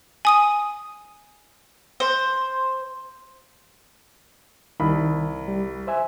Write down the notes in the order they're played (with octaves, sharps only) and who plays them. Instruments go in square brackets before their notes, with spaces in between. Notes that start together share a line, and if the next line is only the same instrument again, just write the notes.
[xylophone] G#5 D#6 D#7
[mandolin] C5
[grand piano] C2 B5 [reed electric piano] D#3
[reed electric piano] G3
C5 E5 G#5